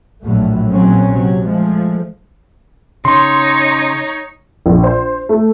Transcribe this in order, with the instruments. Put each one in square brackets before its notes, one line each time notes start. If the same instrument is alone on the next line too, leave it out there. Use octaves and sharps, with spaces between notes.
[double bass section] A#1 A2 F#3 A3
A#2 C#3 F#3 C4 C#4
C3 F#3
F3 G#3 A3
[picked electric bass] C#3 [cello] D#4 C#5 [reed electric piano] C6
[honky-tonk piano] A#1
C5
A3